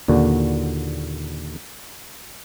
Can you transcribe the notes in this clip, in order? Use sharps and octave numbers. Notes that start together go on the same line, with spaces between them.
D#2 A#2 D3 F#4